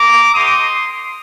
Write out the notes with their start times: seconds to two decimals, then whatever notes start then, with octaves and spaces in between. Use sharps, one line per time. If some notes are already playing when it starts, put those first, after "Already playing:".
Already playing: A#5 D6
0.35 A#3 D#4 G4 C6 D#6